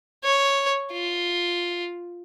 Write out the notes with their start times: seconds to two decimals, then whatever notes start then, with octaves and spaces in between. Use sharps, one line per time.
0.24 C#5
0.93 F4